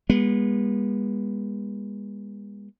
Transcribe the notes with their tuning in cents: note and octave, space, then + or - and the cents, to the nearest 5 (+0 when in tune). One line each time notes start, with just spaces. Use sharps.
G#3 -40 B3 -35